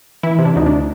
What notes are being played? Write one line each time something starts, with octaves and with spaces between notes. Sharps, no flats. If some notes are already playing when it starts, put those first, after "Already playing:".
E3 E4
C3
D4
D2 D#4
D4